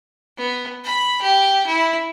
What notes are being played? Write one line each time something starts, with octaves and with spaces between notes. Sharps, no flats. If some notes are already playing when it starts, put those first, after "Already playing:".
B3
B5
G4
E4